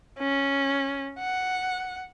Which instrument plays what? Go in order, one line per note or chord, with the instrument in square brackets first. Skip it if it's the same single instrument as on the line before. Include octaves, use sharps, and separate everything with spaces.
[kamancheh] C#4
F#5